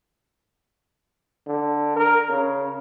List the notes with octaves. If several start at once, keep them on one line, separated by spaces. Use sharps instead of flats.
D3
A#4
C#3